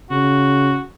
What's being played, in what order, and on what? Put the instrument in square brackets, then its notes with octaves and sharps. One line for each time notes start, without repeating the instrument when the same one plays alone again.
[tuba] C#3 [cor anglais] F#4